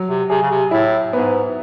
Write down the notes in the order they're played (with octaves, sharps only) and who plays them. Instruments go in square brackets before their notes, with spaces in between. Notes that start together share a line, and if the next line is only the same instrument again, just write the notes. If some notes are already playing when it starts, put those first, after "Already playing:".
Already playing: [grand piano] F#3
[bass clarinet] C3
[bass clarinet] C3 [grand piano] G#4
[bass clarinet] C#3
C3
[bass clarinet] A2 [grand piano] E4
[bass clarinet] G#2 [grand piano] B3